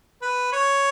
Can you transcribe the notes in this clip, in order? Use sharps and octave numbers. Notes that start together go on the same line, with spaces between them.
B4
C#5